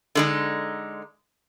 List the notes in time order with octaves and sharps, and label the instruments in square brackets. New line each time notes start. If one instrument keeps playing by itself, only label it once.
[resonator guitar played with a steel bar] D3 G#3 D#4